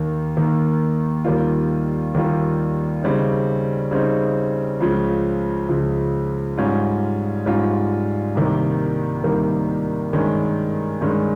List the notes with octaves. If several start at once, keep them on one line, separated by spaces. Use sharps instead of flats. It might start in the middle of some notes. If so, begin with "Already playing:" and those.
Already playing: D#2 D#3 A#3
D#2 D#3 A#3
D#2 D#3 G3 A#3 F4
D#2 D#3 G3 A#3 F4
C#3 G3 C4 D#4
C#3 G3 C4 D#4
C#2 C#3 F3
C#2 C#3 F3
G#2 G3 C#4 F4
G#2 G3 C#4 F4
C2 C3 D#3 G3 A#3
C2 C3 D#3 G3 A#3
G2 D#3 G#3 C#4
G2 D#3 G#3 C#4